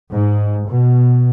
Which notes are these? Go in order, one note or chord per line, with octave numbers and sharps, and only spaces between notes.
G#2
B2